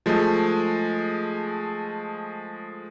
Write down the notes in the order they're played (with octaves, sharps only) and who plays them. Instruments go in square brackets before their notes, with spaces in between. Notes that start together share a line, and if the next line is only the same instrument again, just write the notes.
[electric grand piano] F3 G#3 A3